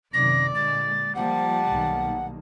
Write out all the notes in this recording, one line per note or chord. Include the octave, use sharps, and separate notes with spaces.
F#2 C3 D#3 D5 A#6
A#2 D3 G#3 A6
F3 G3 A#3 F#5 A5
B1 D#3 A#3